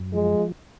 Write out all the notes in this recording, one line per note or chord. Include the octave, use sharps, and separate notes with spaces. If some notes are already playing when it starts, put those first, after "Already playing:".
Already playing: F#2
F3 G#3